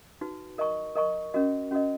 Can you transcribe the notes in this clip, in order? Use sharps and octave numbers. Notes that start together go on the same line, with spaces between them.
D#4 F#4 B4
A#4 D#5 A#5 C#6
A#4 D#5 A#5 C#6
C#4 F#4 A#4 D#5
C#4 F#4 A#4 D#5